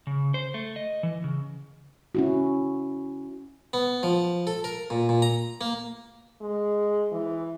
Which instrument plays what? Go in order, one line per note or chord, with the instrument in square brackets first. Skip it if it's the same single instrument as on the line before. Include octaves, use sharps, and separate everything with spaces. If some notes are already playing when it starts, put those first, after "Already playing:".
[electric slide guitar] C#3
C5
A3
D#5
E3
C#3
[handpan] C#4 E4 F#4
[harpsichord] B3
F3
A4
A#4
A#2
A#2
A#5
A#3
[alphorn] G#3
E3